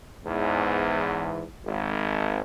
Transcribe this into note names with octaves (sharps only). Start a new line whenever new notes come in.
E2 G#2
G#1